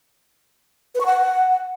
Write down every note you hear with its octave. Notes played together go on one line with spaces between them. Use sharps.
B4
C#6
F#5